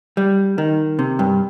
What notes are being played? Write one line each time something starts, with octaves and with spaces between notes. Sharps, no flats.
G3
D#3
C3
G2